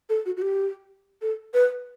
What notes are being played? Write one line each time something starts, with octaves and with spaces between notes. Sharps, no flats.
A4
F#4
F#4
G4
A4
B4